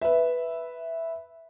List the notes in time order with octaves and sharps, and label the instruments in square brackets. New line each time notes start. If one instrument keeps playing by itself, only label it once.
[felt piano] B4 E5